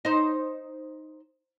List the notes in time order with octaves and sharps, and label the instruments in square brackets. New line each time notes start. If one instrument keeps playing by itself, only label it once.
[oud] D#4 C5